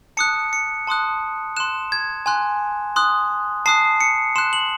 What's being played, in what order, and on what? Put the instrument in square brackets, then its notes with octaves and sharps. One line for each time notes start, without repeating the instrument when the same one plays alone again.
[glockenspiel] A5 D#6 F#6 C#7
C#7
A5 C6 D#6 F#6
C6 F#6 E7
G#6
G#5 C6 F#6
C6 D#6 F#6
A5 D#6 F#6 C7
C#7
C6 F#6 E7
F#7